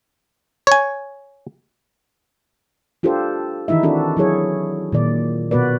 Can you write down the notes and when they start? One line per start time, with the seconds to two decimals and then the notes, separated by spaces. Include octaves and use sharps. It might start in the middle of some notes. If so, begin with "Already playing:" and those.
0.67 C#5 G#5
3.03 D4 F4 G4 A4 C5
3.68 D#3 E3 D#4 E4 E5
3.83 C4 D4 F#4 A4
4.17 F#3 E4 G#4 C#5
4.92 A#2 D#3 D5
5.51 B2 B3 F#4 B4 D5